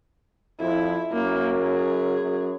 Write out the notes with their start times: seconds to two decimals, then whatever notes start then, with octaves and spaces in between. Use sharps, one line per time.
0.60 F2 E4
1.12 F#2 A#3
1.58 G#4
2.20 F#2